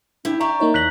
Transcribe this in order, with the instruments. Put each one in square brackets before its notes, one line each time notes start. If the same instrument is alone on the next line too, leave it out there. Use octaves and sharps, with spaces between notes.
[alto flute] D4 [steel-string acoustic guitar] E4 G4
[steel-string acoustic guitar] G4 D5 E5 [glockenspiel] A#5 [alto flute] C#6
[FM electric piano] A#3 D#4 C#5
[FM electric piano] E2 G6 A#6 [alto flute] C#5 [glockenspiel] F#6 B6 F#7